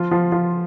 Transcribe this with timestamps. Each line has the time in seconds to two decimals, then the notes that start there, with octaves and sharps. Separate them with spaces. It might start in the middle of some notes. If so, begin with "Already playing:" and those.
Already playing: F3 F4
0.11 F3 F4
0.32 F3 F4